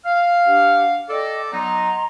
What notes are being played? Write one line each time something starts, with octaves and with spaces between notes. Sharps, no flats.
F5
D4 G4 F#5
A4 D5 D#5 G5
F#3 B3 D#4 D#5 A#5 C6